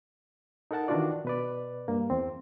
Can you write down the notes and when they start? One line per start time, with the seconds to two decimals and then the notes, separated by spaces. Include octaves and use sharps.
0.71 D#4 A4 A#4 F#5 A5
0.88 D#3 E3 D4 F4 F#4 D5
1.25 B2 B4 D5
1.88 G2 A#3
2.10 E2 C4